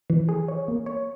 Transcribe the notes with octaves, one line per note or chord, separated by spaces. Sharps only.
E3
G#4
C#5
A#3
C#5